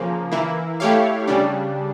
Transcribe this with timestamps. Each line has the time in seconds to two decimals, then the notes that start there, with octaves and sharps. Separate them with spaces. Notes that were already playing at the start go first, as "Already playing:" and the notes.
Already playing: C#3 F3 A#3
0.32 E3 A#3 E4
0.80 A3 E4 G4 C#5 F5
1.27 C#3 G3 D4